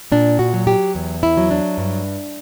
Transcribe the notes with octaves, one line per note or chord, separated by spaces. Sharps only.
A#2 D4
F#4
F#3
G4
E2
E4
F#3
D4
G2